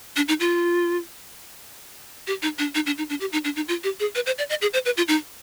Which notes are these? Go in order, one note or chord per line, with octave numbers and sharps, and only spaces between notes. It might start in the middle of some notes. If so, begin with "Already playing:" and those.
D4
D#4
F4
G4
D#4
D4
D#4
D4
D#4
D4
G4
D#4
D4
D#4
F4
G4
G#4
B4
C5
D5
D#5
G#4
C5
B4
F4
D#4